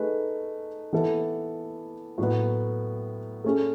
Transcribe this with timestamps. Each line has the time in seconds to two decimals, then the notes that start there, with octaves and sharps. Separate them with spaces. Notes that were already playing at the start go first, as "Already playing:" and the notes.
Already playing: A3 D#4 G#4 B4
0.93 E3 B3 E4 A4
2.18 A2 F#3 B3
3.44 A3 C#4 G#4